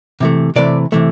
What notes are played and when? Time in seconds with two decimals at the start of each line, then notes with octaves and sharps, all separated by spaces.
0.20 C3 E3 A3
0.56 C3 E3 A3 D5
0.92 C3 E3 A3